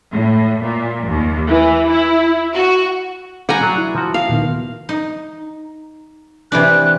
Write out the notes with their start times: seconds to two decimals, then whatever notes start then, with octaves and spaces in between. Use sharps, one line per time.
0.12 A2
0.61 A#2
1.05 D#2
1.48 E3
1.89 E4
2.54 F#4
3.49 G3 G#4 F#5 G#5 A#5
3.62 F#3 D4
3.78 E4
3.96 F3 F#4
4.14 F5
4.29 A#2 D#3 B3
4.89 D#4
6.52 C3 E3 D4 F#6